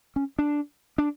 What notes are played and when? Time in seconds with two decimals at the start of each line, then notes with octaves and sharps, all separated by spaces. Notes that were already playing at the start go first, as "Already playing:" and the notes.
0.16 C#4
0.39 D4
0.98 D4